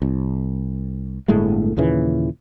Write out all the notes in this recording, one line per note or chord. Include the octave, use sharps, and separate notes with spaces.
C2
G1 A2 G#3 A3
D#2 A#2 C#3 E3